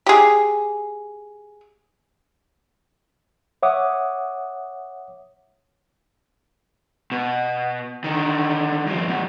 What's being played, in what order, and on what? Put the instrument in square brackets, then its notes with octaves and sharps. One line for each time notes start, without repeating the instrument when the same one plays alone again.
[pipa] G4 G#4
[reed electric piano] C#5 E5 F#5 D6 D#6
[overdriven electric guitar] B2
D3 D#3
G2 F3
F#2 B2